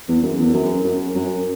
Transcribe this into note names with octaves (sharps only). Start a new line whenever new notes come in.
E2
F#2
E2
F#2
F#2
F#2